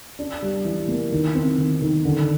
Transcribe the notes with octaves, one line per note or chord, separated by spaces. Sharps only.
D4
G3
E3
A#3
D#3
C4
D#3
D#3
D3